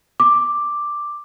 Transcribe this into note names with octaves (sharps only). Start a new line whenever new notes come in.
D6